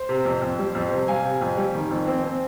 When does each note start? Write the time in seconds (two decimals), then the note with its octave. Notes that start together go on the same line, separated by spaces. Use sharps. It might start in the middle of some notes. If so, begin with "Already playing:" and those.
Already playing: C5
0.09 C3
0.25 F2
0.42 F2
0.59 G3
0.75 F2
0.91 C3
1.08 G3 F5 G#5
1.24 C3
1.41 F2
1.57 G3
1.74 D#3
1.91 F2
2.07 C4
2.24 C4